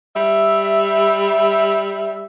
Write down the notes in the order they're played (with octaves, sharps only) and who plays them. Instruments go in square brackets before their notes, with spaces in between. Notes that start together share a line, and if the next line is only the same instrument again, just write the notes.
[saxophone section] G3 E5